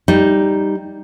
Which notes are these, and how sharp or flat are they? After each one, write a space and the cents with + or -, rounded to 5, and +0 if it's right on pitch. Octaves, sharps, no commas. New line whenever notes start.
G3 +0 D#4 +0